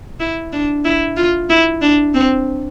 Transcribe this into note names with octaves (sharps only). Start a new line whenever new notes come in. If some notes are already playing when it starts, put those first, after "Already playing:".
E4
D4
E4
F4
E4
D4
C4